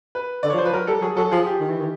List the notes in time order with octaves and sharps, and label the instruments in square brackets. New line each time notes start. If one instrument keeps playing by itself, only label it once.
[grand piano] B4
[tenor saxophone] D3 [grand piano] D5
[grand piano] C#5
[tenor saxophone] F3
[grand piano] C5
[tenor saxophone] F3 [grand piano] B4
[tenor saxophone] F#3 [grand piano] A#4
[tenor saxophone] G3 [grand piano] A4
[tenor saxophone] F#3 [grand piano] G#4
[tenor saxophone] F#3 [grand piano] A4
[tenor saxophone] F3 [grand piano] G#4
[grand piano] G4
[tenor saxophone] D#3
E3
D#3